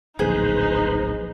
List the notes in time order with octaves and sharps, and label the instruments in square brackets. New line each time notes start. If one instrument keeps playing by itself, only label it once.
[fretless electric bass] D1 A#1 [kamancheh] D#4 [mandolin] G#4 [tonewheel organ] B4 C5